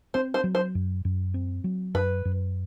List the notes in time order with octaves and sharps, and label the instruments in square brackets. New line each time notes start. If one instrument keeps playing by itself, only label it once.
[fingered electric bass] C4 [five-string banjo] C5
[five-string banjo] C5
[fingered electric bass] F#3
[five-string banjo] C5
[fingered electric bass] F#2
F#2
C4
F#3
[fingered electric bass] F#2 [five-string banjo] B4
[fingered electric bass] F#2